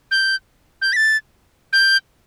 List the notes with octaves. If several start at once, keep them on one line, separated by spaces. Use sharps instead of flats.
G6
G6
B6
A6
G6